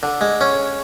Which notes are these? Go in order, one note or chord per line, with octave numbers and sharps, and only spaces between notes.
D3
G#3
C#4